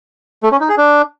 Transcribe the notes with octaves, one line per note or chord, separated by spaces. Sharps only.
A3
C#4
D#4
G#4
D4